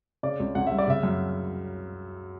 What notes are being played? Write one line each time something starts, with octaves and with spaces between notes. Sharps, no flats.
C#3 D5
C#2
C#2 F#5
G3 E5
D5
C#3 E5
F#2